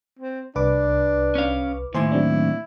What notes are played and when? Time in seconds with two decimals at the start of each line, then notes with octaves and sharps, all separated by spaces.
0.19 C4
0.55 C2 D4 B4 D6
1.35 C#4 F5
1.94 D#2 A2 E4 C5 G#5 C6
2.12 F#3 C4 D4